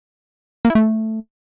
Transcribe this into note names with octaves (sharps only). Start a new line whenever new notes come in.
A#3
E4
A3